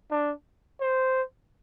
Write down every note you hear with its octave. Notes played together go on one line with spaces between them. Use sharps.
D4
C5